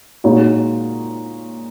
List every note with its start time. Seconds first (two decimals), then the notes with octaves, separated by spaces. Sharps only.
0.24 A#2 G#3 D#4 F#4 C#5